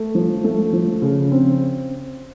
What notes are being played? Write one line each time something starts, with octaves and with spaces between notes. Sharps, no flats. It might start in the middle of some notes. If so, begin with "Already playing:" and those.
Already playing: A3
F3
A3
F3
C#3
C4